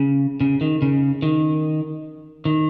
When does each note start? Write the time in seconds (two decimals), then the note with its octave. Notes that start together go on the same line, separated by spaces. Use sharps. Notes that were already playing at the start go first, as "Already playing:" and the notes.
Already playing: C#3
0.41 C#3
0.61 D#3
0.82 C#3
1.22 D#3
2.45 D#3